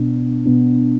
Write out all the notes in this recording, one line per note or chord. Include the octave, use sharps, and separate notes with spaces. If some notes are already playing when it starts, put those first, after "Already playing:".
Already playing: B2 B3 D4
B2 B3 D4